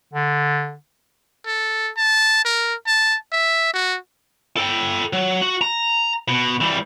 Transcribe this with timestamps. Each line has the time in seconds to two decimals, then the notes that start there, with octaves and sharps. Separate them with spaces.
0.13 D3
1.46 A4
1.97 A5
2.45 A#4
2.87 A5
3.32 E5
3.74 F#4
4.57 A4 G5
5.13 F#3
5.42 F#4
5.61 A#5
6.28 B2
6.61 E3 G3